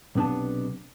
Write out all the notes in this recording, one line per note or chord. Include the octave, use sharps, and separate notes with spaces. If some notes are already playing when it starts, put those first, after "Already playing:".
B1 C3 B3 D4 A5